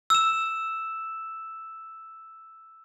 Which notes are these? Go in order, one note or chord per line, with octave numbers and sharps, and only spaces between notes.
E6 E7